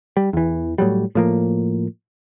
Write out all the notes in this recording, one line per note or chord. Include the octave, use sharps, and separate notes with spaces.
G3
E2 E3
A2 F#3 G3
A2 F3 A#3